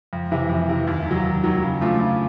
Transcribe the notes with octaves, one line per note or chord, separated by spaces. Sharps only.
F2
C3 E3
F2
C3 E3
D#2
D#3
F#3
D#2
D#3 F#3
C#3
F3 A3 D4 F4
C#3